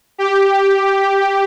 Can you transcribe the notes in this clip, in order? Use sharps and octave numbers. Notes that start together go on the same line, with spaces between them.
G4